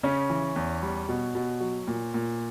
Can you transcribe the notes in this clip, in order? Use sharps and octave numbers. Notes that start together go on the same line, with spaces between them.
C#3 C#4
E3
E2
G3
B2
B2
F#3
A#2
A#2